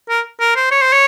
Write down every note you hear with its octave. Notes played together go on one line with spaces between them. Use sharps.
A#4
A#4
C5
C#5
C5
C#5